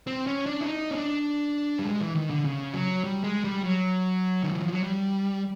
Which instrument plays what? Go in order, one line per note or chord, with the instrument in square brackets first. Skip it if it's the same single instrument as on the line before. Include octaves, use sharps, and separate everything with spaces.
[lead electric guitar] C4
C#4
D4
E4
D#4
C#4
D4
G3
G#3
E3
D#3
D3
C#3
F#3
G3
G#3
G3
F#3
D#3
E3
F3
F#3
G3